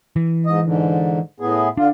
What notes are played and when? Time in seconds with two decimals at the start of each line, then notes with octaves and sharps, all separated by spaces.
0.16 E3
0.46 G#2 D#5
0.65 G#2 D3
1.40 A2 B3 G#4
1.77 D3 D4 F4